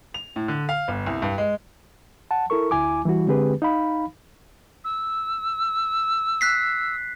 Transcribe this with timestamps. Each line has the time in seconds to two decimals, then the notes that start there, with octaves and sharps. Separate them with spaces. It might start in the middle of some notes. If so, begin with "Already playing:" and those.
0.14 F7
0.36 A2
0.48 D3
0.69 F5
0.88 G1
1.07 C2
1.22 G2
1.38 G#3
2.31 F#5 A5
2.50 E4 A4 A#4 C#6
2.71 D2 E4 G#5 D6
3.05 E3 G3 E4 F#4
3.27 D3 G#3 C4 G4 G#4 B4
3.62 D#4 F5 B5
4.84 E6
6.41 F#6 B6 C7